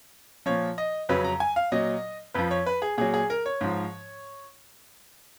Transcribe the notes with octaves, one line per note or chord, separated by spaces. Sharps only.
A#2 F3 C#5
D#5
F2 C#3 F#3 B4
A#5
G#5
F5
A#2 F#3 D#5
F2 F3 B4
C#5
B4
G#4
A#2 F#3 G#4
G#4
A#4
C#5
G#2 F3